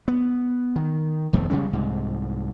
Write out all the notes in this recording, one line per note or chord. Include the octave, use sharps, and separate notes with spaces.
B3
D#3
E1 F2 D#3 A3
C#3 G3 G#3 C#4
C2 G#2